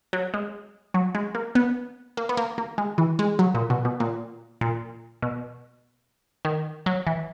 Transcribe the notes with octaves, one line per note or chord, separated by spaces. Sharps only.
F#3
G#3
F#3
G#3
A#3
B3
A#3
B3
A#3
A#3
G#3
E3
G#3
F#3
A#2
B2
B2
A#2
A#2
B2
D#3
F#3
E3